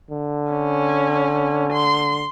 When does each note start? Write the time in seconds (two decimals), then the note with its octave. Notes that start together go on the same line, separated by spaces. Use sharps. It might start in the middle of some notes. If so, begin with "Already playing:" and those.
0.11 D3
0.51 C#4
1.73 C6